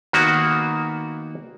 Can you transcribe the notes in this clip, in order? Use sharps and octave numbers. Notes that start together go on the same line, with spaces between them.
D#3 A#3 B3 F#4